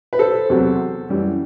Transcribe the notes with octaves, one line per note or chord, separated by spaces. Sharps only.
B4
A4 C5
E2 C3 F#3
F#2 E3 G3